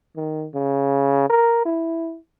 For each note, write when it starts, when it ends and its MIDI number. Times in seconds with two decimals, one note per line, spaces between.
0.16 0.46 51
0.54 1.27 49
1.30 1.61 70
1.66 2.17 64